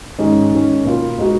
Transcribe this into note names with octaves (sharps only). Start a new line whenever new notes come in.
G#2 D#3 G#3 C#4
D#3 G#3 C#4
B2 A#3 F4 B4
B2 G#3 D#4 F#4